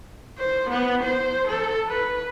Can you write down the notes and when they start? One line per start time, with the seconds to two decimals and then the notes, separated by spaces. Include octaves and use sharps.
0.38 C5
0.69 B3
1.03 C5
1.47 A4
1.87 B4